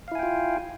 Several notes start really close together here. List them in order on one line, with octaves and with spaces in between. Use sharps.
F5 E4 G#5 G5 F4